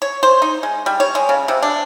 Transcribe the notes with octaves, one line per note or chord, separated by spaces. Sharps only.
C#5
C5
D#4
G#3
G3
C#5
G#3
C#3
C3
D4